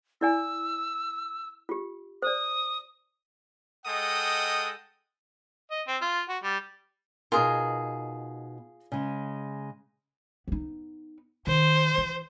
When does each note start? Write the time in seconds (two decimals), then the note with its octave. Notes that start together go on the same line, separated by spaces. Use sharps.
0.21 E4 D5 G#5 E6
1.69 F4 G4
2.22 C5 D5 D#6
3.86 G#3 A4 D#5 F#5 G5 D#6
5.71 D#5
5.87 C4
6.02 F4
6.29 F#4
6.43 G3
7.32 B2 D#4 F4 G#4 A#4
8.92 C#3 G#3
10.48 B3 D#4
11.47 D#3 C5
11.98 E3